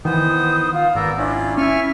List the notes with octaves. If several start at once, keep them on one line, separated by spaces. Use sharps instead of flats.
D#3 E3 B3 C5 D#6
F4
G#1 B3 A#4 D5 E6
C#4 D4 E4 F4
C#4 E4 G#5 C#6 F6